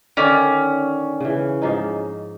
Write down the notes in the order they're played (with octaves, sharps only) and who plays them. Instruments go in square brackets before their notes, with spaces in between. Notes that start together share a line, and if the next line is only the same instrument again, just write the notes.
[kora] D3 D#3 D5 [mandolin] C#4
[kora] C#3 E3
G#2 F3 D#4